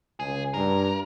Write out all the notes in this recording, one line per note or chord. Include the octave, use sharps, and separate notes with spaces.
C#2 G#4
G2 A#4